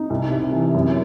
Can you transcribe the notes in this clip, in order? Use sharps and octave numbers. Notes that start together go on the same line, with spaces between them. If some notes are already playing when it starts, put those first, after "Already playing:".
Already playing: D#4
C2
C3
E3
F#2